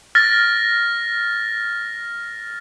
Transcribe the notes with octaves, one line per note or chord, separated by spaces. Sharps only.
F6 A6 A#6